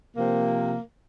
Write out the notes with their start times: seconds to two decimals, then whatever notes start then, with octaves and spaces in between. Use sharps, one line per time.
0.17 C3 F3 A#3